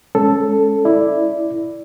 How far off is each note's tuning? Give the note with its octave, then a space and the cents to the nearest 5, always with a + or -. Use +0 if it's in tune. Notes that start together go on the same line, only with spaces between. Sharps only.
G#3 +0 C#4 +0 A4 +0
E4 +0 D5 +0